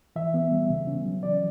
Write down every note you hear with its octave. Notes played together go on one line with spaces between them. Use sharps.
E3 E5
B3
G3
C#3
C#4
F#3
E3 D5